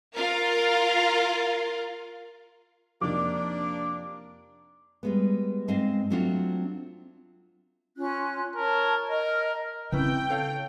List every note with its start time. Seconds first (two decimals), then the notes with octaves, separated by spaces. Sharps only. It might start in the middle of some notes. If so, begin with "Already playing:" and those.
0.16 F4 A#4 F5
3.01 F2 C3 A#3 D4 D#4 D6
5.03 G3 G#3 B3
5.68 G#2 G#3 C4 D#5 F5
6.10 F#3 A3 C4 D4 F4 F#4
7.96 C#4 F4 F#6
8.56 A#4 C#5 A5
9.10 A#4 D#5 F6
9.92 C#3 C4 C#4 E4 B4 G5
10.30 A4 C#5 F5